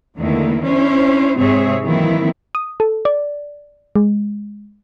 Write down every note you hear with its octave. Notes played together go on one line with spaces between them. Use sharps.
E2 D3 D#3 A3 A#3 E4
C#4 D4 E4 C5
G#2 C3 C4 G#4 C#5 E5
D#3 E3 F#3 A#3 C4 E4
D#6
A4
D5
G#3